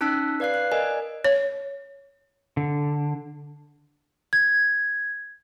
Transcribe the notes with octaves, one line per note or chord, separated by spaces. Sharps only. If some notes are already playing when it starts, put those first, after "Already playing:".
C#4 D#4 A5 E6 F#6 B6
B4 D5 F5 F#6 C7
F#6
A#4 D5 D#5 G#5
C#5
D3
G#6